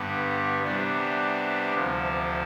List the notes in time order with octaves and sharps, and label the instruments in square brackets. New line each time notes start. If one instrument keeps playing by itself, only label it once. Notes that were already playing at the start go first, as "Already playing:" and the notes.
Already playing: [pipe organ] G2 D3 G3 B3
C3 E3 G3 B3 D4
D2 C3 F3